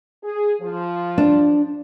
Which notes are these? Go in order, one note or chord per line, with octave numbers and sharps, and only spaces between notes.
G#4
F3
D4